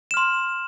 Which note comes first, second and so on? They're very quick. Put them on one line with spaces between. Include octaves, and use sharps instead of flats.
E7 F6 C6